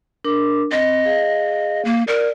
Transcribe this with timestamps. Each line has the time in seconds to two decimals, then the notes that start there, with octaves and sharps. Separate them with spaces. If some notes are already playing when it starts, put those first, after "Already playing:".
0.24 D4 A#4 D6
0.72 C4 D#5
1.06 G#4 F5
1.85 A#3
2.08 A#4 D5